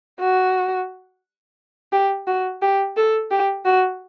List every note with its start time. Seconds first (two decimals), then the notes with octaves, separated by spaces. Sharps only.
0.20 F#4
1.92 G4
2.27 F#4
2.62 G4
2.97 A4
3.31 G4
3.65 F#4